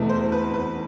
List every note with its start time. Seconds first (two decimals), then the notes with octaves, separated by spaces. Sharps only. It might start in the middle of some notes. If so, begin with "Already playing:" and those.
Already playing: E2 B2 A3
0.09 C5
0.32 B4
0.54 B4